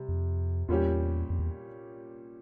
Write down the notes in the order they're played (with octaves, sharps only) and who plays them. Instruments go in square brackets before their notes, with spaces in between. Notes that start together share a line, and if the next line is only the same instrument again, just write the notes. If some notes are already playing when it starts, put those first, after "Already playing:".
Already playing: [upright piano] C3 G3
[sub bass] F2
[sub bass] E2 [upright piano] A#2 G3 C#4 G4
[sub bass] F2
E2